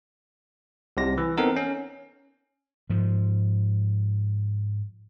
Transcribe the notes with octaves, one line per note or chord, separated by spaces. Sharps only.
C2 C3 A#6
E3
B3 C4 D#4 A4 A#4 F#5
C#4
G#2 F3